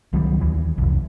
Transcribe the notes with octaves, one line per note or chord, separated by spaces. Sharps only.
C#2 D#3 F#3 G3
D#2 E3
F1 C2